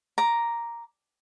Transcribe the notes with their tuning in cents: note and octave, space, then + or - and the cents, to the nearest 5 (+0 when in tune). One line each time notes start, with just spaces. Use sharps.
A#5 +0 D6 +0